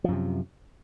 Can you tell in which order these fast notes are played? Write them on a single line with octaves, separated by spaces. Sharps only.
F3 F#2 C3